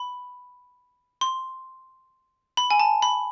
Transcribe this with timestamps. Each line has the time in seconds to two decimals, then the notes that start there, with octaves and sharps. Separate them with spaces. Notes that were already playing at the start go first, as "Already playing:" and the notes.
Already playing: B5
1.21 C6
2.57 B5
2.71 G#5
2.80 A5
3.02 B5